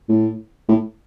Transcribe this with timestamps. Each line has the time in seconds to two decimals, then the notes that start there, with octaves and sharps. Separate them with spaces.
0.09 A2
0.69 A2